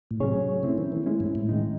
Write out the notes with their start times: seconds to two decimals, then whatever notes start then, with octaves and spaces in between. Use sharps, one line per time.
0.11 A2
0.20 C3 F#3 C#4 G#4 C#5
0.63 C#3 A3 C4 E4
0.78 D#3
0.92 E3
1.06 G#3 C#4 E4
1.20 G#2
1.35 A2
1.49 D#3 G#3 D#4